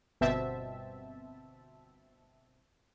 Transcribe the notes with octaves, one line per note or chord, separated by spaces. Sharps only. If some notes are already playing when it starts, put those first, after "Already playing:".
G1 B2 C4 E5 A5